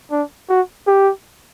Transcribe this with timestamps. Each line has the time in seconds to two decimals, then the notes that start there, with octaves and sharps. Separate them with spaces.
0.11 D4
0.49 F#4
0.87 G4